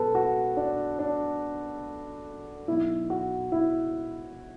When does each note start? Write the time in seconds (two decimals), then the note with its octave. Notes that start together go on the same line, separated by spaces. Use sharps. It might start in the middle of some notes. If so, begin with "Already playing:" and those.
Already playing: B1 B2 A4 B4
0.15 F#4
0.57 D4
0.99 D4
2.68 B1 B2 E4
3.10 F#4
3.52 E4